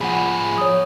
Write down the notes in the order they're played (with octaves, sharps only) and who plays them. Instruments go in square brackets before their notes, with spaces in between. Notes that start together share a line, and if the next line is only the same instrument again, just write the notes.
[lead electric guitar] F3 G#4 [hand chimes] F#5 B5
[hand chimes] C#5 D#6